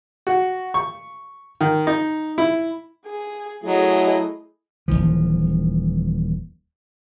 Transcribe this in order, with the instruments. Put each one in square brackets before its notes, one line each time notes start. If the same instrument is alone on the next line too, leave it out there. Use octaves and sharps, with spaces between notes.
[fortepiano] F#4
C#6
D#3
D#4
E4
[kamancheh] G#4
[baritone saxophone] F#3 [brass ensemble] A3 E4 [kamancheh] G#4 D#5
[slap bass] D#1 E2 E3 F3